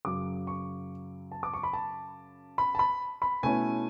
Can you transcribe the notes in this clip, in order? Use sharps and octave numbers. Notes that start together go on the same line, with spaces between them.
F#2 C#3 F#3 D6
C#6
A5
D6
C#6
B5
A5
B5
A5
B5
B5
B2 A3 C#4 E4 G#5